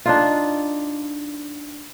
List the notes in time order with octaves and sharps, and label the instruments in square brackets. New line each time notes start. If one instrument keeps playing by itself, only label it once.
[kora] D4 D#4 F4